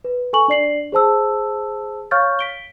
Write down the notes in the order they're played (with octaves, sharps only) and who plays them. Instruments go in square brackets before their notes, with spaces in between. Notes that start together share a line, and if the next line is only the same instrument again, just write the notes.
[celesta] B4
A4 G#5 C#6 F#7
D4 D5 C7 F#7
G#4 C5 A5 E6
C#5 F5 C#6 F6 G6 A6
B6 D7 G7